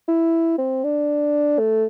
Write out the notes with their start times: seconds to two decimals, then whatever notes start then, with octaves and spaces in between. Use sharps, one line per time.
0.08 E4
0.58 C4
0.84 D4
1.59 A3